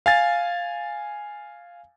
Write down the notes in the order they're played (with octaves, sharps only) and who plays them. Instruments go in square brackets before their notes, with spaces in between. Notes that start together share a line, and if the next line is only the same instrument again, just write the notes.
[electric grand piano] F5 G#5 A6